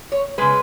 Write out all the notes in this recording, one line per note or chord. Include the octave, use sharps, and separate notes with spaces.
C#5
C#3 G#3 B4